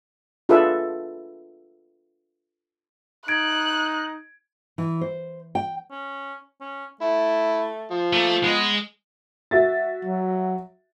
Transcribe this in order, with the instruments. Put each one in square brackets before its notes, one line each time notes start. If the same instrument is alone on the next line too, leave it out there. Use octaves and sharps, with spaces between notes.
[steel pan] D4 F4 G#4 A4 B4 E5
[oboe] D#4 [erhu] F#6 [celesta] G#6 D7
[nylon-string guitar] E3
C5
G5
[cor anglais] C#4
C#4
[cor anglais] A3 [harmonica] E4
[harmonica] F3
[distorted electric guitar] A3 [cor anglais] A#3
[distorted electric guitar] G#3 D#5 [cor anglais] B3
[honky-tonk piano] F#4 E5 A6
[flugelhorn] F#3